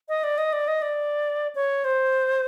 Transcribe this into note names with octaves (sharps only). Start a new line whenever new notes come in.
D#5
D5
D#5
D5
D#5
D5
C#5
C5